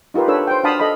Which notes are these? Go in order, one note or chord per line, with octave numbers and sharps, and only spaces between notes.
D#4 F4 G4 A#4 B4
D4 A4 B4 C#5 E6
C5 G5
D4 F#4 F5 A5 B5 D#6
A4 D#5 F5 B5